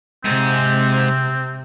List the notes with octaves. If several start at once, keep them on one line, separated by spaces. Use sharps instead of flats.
G#2 C3 C4